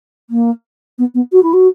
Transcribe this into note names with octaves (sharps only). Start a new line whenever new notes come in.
A#3
B3
B3
F#4
E4
F#4